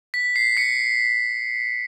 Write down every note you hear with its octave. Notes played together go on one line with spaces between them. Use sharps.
B6
C7
B6 C#7